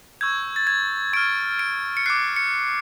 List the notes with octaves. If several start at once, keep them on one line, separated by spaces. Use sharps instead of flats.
C#6 E6 G6 G#6
A6
G#6
C#6 F6 D7
D7
C#7
D6 F#6 C7
C#7